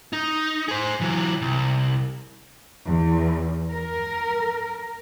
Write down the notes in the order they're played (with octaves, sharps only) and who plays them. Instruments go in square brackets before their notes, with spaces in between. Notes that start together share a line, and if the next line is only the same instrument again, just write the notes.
[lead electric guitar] D#4
G#4 C5
E3 F#3
C2
[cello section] E2
A#4